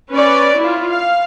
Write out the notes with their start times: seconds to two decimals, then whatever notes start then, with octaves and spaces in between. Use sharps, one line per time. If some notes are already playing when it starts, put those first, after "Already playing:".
0.11 C#4 B4 C#5 D5
0.58 E4 F4
0.87 F5